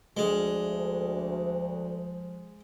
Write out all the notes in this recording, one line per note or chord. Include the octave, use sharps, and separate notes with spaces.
D2 F3 G#3